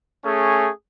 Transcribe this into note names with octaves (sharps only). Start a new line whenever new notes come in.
A3 C#4 G#4